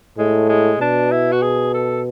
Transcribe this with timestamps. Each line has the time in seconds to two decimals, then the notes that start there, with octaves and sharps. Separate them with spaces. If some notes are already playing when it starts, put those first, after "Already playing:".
0.18 A2 G#3
0.49 G#3
0.80 B2 D4
1.11 E4
1.32 F#4
1.42 G#4
1.74 A4